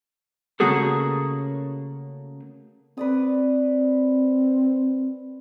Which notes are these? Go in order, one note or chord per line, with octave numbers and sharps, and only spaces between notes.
C#3 A3 A#3 F#4 G#4 A4
C4 B4 D5 D#6